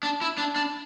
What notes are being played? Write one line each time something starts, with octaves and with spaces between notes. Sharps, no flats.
D4
E4
D4
D4